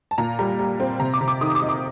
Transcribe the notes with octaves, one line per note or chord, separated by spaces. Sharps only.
A5
A#2 A#5
G3 A#5
G3
C4
C3 A#5
D6
C3
D6
D#3 D#6
D6
D#4
D6